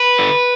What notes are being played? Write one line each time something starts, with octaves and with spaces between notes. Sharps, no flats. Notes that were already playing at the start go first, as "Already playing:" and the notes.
Already playing: B4
D3